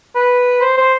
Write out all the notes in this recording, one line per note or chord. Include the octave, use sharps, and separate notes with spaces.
B4
C5
C5